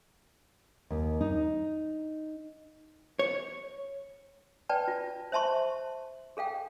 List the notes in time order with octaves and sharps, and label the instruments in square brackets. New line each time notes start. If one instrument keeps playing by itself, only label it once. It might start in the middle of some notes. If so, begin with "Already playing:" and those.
[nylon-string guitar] D#2
D#4
[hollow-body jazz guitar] C#5
[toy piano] B4 D5 G5 A5
F4
C5 E5 A5 C6 C#6
G#4 A4 F5 G5